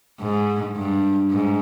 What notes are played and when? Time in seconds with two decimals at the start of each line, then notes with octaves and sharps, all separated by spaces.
0.20 G#2
0.76 G2
1.32 G#2